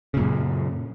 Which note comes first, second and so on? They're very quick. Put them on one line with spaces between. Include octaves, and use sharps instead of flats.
C#3 A#2 F#2